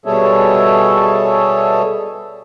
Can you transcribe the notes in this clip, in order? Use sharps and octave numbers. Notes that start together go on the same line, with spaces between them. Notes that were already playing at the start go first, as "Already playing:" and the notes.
B2 G3 G#4 A4 C#5 E5